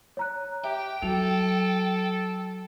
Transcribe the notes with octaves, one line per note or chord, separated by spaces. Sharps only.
C#5 A#5 F#6
G4 E5 G5
F#3 A4 F7